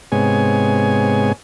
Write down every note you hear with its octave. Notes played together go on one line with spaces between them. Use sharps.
G#2 C3 G#3 B3 C#5 G#5